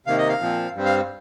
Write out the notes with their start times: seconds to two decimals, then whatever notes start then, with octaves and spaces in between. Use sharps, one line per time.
0.06 C3 D#3 A#3 F5
0.18 D#5
0.29 F5
0.40 A#2 F3 C4
0.74 G2 G3 C4
0.85 F5